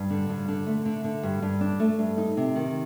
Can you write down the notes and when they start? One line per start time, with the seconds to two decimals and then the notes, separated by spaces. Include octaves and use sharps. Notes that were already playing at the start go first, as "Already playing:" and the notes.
Already playing: G2
0.10 D3
0.29 G2
0.48 D3
0.67 A3
0.86 D3
1.04 D3
1.23 G2
1.42 G2
1.61 D4
1.80 A3
1.99 G2
2.18 D#4
2.37 C3
2.55 D#3